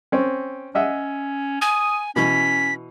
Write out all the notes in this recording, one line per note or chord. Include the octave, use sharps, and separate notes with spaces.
C4 C#4
C#4 D#5 E5 F#5
G#5 D#6
B2 E3 C#4 B6